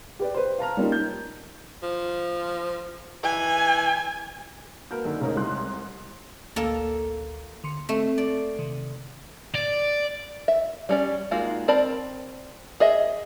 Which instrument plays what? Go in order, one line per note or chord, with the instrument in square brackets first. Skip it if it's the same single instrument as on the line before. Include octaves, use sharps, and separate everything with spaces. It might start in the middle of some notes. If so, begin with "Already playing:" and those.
[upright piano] G4 B4 D5
B4 C5
F5 A5 A#5 F6
G3 A#3 C#4 D#4 F4
G6
[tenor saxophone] F3
[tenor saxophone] E3 [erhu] G#5
[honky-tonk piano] A#3 G6 [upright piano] F#4 A#4 B4
[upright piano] F#2 D3 D#3
[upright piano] F1 G#2 D#4 [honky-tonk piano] C#3 C#4 A#4
[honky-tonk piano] C2 C6 F#6
[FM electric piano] A1 D2 [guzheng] A#3 A4
[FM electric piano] D3 C6 C#7
[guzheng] A3 [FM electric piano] C4
[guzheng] D5
[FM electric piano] C3 D#3
[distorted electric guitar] D5
[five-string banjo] E5
G3 C#4 D5
G#3 A#3 D#4 F4 F#4
C4 A#4 D5 A5 B5
G#4 D#5 E5